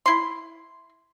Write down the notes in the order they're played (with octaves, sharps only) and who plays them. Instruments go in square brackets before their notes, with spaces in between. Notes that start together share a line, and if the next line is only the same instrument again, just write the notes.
[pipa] E4 C6